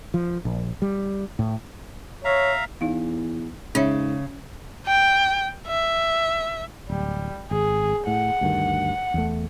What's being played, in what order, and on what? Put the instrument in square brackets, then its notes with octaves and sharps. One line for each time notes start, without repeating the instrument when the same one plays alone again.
[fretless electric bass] F3
A#1
G3
A2
[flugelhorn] C#5 [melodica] E5 F5 A#5
[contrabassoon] E2 [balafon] D#4 F5
[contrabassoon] G#2 [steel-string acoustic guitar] C#3 [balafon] C#4 C#5 E5
[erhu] G5
E5
[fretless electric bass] D1 [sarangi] G3
[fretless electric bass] G#1 [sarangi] G#4
[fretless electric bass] A2 [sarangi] F#5
[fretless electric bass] D2 G2 D#3
E2 A3